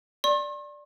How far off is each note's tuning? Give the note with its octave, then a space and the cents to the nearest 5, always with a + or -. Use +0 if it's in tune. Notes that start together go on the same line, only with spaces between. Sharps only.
D5 +0 C6 +45